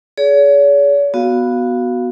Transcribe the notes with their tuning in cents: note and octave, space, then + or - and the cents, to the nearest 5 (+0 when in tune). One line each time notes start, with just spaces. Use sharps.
G#4 +20 C#5 +45
B3 +0 F#4 +0 F5 +0